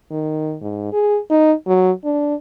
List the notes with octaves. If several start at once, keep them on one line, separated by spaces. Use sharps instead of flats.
D#3
G#2
G#4
D#4
F#3
D4